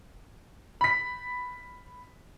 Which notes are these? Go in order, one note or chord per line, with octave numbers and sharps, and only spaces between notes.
B5 B6